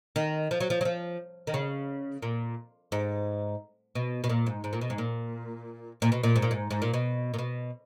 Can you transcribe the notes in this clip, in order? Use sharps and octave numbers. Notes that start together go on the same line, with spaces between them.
D#3
F3
F#3
F3
F#3
F3
D#3
C#3
A#2
G#2
B2
B2
A#2
G#2
G#2
A#2
B2
G#2
A#2
A#2
B2
A#2
G#2
A#2
G#2
G#2
A#2
B2
A#2
B2